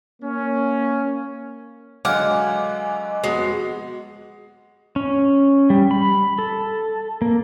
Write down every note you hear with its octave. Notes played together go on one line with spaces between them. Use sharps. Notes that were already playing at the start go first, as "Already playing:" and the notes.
A#3 C#4
D3 F#3 G#3 D#5 F5 F#5 G#5 D6
F2 G#3 B3 F#4
C#4
G3
B5
A4
A#3